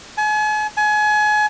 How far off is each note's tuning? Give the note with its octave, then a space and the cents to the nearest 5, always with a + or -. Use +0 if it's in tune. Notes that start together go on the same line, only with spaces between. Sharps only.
G#5 +40
G#5 +30